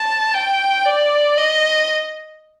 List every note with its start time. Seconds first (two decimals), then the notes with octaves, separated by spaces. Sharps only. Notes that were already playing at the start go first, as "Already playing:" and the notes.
Already playing: A5
0.34 G5
0.86 D5
1.38 D#5